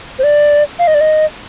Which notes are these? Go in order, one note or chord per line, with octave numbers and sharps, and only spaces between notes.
C5
D5
F5
D#5
D5
D#5